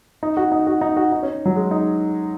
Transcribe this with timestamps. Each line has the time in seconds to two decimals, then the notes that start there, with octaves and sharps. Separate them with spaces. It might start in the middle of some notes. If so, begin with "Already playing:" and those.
0.23 D#4
0.37 F#4
0.52 D#4
0.67 F#4
0.81 D#4
0.97 F#4
1.12 D#4
1.23 C#4
1.45 F#3
1.56 G#3
1.71 D#4